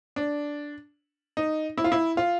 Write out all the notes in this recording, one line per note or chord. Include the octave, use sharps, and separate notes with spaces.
D4
D#4
E4
F4
E4
F4